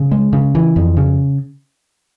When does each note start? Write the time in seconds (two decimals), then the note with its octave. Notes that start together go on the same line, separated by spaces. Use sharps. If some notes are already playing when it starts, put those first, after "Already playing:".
Already playing: C#3
0.11 G#3
0.33 C#3
0.55 E3
0.76 F2
0.97 C#3